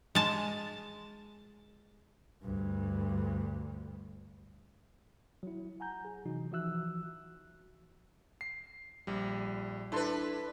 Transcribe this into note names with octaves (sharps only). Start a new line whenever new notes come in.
G#3 A5
D2 G2
F#3 E4
F#5 G#5 A#5 G6
G#4
C3 E3 F#3 D#4 F#4
E3 F3 F#4 E5 E6 F#6
C7
A#1 G3
D4 E4 A4 B4 C6